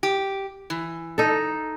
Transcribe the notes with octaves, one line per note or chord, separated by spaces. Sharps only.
G4
E3
D#4 A4